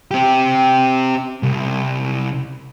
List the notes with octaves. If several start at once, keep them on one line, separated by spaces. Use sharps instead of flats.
C4 G4
C2